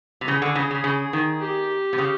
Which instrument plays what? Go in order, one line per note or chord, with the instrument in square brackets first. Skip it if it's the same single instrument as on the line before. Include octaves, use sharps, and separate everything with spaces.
[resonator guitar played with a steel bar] C3
[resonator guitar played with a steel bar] C#3 [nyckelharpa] G#4
[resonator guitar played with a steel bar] D3
C#3
C#3
C#3
D#3
[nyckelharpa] G4
[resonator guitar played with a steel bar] C3
C#3